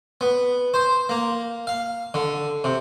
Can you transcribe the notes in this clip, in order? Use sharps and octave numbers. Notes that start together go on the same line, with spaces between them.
B3
C5
A#3
F5
D3
C3